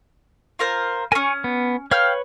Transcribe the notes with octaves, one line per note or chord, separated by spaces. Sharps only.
F4 A#4 C5
A#3 C#4 G#5 C#6
B3
B4 C#5 F5 G5 F6